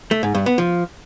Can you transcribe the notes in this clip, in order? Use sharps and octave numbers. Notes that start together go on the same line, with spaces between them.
A3
G#2
G2
B3
F3